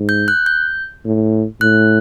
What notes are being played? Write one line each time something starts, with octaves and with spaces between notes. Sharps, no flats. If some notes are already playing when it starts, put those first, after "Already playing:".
Already playing: G#2
G6
F#6
G6
A2
A2 F#6